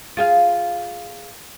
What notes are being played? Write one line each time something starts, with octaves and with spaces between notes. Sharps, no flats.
F4 G#4 F5